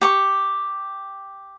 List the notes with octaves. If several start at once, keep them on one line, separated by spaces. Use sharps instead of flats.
G4 C#6